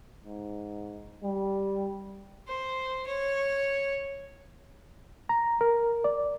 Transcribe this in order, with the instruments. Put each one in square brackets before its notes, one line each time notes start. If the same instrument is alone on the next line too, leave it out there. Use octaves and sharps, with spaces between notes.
[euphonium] G#2
G3
[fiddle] C5
C#5
[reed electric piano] A#5
A#4
D5